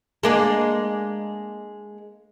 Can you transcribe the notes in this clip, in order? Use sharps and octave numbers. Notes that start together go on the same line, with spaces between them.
G#3 A#3 D4